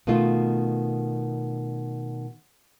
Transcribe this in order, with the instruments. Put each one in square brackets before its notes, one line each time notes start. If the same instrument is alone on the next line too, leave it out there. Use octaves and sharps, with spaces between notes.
[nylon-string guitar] B2 D#3 A3 F4